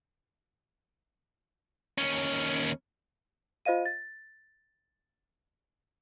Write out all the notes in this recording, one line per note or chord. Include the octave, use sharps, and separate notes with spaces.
D#2 C#4
F4 C5 D#5 F5 D#7
A6